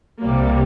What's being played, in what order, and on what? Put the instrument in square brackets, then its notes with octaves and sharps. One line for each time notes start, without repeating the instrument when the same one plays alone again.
[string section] C2 C3 G3 A#3